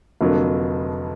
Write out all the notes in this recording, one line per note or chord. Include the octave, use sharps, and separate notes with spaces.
F1 F2 D3 F#3 A#3